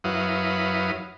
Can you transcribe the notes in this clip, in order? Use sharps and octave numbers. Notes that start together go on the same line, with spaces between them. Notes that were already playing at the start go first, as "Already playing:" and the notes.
F#2 F#3 E4 B4 F5 D#6